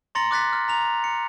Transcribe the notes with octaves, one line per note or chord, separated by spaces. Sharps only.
A#5 C6 A6 A#6 C#7 F#7
D6 F#6 A6 B6
F6
A#5 F7
C#7